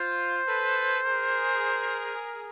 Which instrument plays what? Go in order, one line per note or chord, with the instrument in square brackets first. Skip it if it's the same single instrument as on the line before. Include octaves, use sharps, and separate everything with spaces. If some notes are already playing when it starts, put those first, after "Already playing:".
Already playing: [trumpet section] F4 [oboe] C5
[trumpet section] A4 B4
G#4 A#4